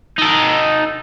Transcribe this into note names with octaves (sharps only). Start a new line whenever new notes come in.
D#4 A4